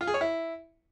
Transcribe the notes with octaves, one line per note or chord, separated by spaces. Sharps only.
F4
G#4
C#5
E4